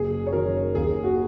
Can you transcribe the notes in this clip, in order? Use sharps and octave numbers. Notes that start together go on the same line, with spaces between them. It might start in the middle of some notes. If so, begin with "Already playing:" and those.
Already playing: F#1 G#4
C#5
F#2 D#3 F#3 A#4
D#2 G#4
F#4